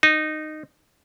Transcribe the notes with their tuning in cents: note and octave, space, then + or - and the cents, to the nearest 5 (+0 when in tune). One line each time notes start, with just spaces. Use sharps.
D#4 -15